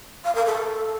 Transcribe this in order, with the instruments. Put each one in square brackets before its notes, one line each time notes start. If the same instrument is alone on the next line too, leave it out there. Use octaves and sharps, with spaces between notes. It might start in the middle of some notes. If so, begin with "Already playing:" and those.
[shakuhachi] F5
A#4
A4